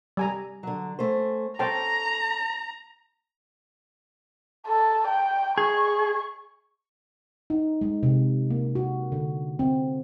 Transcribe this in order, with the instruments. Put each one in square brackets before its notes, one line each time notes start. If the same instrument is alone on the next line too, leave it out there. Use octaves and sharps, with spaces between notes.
[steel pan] G3 G#5 A#5
[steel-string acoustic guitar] D3 F#3
A3 C#4 C5
[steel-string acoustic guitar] C#4 A4 [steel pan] C5 G5 A5 [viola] A#5
[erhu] A4
G5
[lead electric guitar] G#4 [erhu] C#6
[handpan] D#4
G#3
C3
A#3
F#4
D3
C4